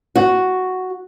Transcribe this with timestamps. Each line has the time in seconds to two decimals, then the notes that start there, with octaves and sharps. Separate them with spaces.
0.16 F#4